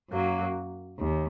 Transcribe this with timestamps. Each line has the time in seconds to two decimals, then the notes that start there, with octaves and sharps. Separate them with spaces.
0.10 F#2 F#3 A#3
0.98 D#2